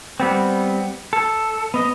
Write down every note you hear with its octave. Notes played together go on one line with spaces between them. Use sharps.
G3 B3 C4
A4
B3 D#5